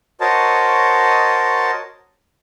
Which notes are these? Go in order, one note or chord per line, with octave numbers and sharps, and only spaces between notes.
F#4 A#4 C5 C#5 D#5 A5